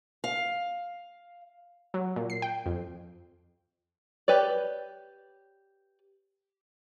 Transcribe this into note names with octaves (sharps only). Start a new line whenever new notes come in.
F5
F#3
A#2
C7
G5
F2
G4 B4 C#5 D5